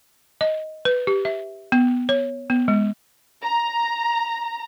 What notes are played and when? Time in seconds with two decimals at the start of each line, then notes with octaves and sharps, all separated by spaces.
0.41 D#5
0.85 B4
1.07 G4
1.25 E5
1.72 B3
2.09 C#5
2.50 B3
2.68 G#3
3.44 A#5